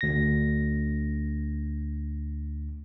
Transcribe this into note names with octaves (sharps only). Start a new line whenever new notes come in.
D2 A#6